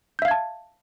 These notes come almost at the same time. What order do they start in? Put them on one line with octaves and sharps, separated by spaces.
G6 E5 F5 G#6 A5